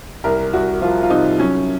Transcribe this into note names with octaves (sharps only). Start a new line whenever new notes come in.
C2 A#4
C2 F#4
F3 F4
F4
C3 D#4
F#3 C#4